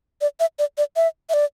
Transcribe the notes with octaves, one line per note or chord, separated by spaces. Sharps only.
D5
E5
D5
D5
E5
E5
D5